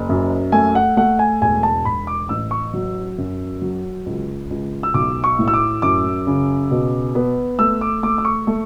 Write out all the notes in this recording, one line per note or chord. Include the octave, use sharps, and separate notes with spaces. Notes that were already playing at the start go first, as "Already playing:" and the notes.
Already playing: F#1
F#2
A3 G#5
F#5
A3 F#5
G#5
E1 G#5
A5
E1 B5
D6
A1 E6
C#6
F#3
F#2
F#3
C#2
C#2
E6
B1 D6
C#6
A2
E6
D6
F#2 D6
C#3
B2
B3
A3 E6
D6
A3 D6
D6
C#6
A3